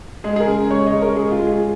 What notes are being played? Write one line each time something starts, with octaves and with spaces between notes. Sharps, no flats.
G#3 G#4
G#4
A#4
C#3
G#3 C#5
D#5
C#3
A#4
G#3 G#4
F4
G#3
G#4